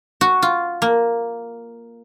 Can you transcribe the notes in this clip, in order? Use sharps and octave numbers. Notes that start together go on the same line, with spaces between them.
F#4
F4
A#3